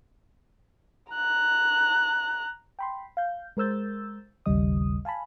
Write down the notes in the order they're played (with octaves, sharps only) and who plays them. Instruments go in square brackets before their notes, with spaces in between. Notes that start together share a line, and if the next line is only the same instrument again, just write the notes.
[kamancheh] A#5 F#6
[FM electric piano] G5 B5 C6
F5 G6
G#3 A#4 C5 E6 G6 A6
A1 D#2 C#3 G3 D#5 D#6
F5 G#5 A5 B5